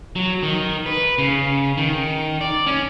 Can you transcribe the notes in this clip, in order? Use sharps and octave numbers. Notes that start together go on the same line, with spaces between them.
F#3
D#3
B4
C#3
D#3
D5
C#4